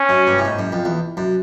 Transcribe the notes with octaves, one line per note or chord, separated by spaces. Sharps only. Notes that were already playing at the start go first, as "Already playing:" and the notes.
Already playing: C#4
F#2
G2
A2
G#2
F#2
F2
E2
F#2